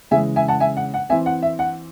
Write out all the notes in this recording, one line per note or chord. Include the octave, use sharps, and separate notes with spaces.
C#3 E3 G#3 E5 G#5
E5 G#5
F#5 A5
E5 G#5
F#5
F#5
E3 C4 E5 G#5
F#5
E5
F#5